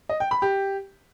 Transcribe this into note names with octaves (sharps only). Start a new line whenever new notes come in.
D#5
G5
B5
G4